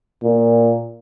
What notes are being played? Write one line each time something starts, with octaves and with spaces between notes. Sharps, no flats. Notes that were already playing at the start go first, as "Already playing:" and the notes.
A#2